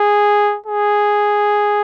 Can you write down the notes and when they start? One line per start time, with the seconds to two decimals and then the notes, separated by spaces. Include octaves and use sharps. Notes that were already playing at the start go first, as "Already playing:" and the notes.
Already playing: G#4
0.66 G#4